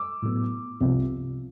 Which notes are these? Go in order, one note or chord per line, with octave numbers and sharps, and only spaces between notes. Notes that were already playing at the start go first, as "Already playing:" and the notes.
Already playing: D6 E6
A2 F#3 B3
C2 C3 F3